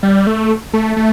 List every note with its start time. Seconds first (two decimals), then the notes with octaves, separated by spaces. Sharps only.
0.03 G3
0.27 A3
0.74 A3
0.97 A3